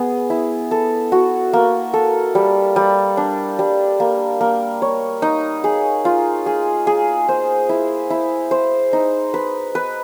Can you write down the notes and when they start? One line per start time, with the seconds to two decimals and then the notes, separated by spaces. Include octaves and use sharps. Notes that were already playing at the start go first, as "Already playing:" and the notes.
Already playing: B3 G#4
0.30 E4
0.71 A4
1.12 F#4
1.53 A#3
1.94 A4
2.35 G3
2.76 G3
3.17 D4
3.59 G3
4.00 A#3
4.41 A#3
4.82 C#5
5.22 D#4
5.64 G#4
6.05 F4
6.46 G#4
6.87 G#4
7.29 C5
7.69 E4
8.10 E4
8.51 C5
8.93 D#4
9.34 B4
9.75 B4